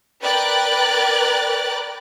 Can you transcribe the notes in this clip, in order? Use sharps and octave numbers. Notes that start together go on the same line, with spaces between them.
A#4 B4 D5 G5 F#6 A6